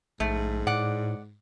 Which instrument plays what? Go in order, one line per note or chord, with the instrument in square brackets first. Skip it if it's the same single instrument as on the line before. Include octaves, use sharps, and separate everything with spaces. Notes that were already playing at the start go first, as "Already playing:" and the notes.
[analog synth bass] A#1 [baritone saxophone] G#2 [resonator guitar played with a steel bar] A3
[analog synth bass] A2 [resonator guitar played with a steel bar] D5 F#5